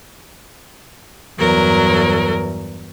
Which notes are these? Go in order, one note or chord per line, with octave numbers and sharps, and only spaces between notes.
E2 G2 F#3 A#4